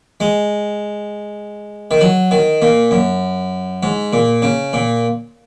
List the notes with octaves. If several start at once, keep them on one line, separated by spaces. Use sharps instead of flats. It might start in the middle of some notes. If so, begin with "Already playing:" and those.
G#3
D#3
F#3
D#3
A#2
F#2
G#2
A#2
C#3
A#2